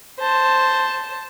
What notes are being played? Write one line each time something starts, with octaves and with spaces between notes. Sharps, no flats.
C5 A5